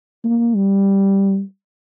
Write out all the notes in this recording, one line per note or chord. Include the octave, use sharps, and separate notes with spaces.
A#3
G3